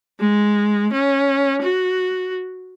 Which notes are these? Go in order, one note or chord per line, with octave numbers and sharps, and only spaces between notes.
G#3
C#4
F#4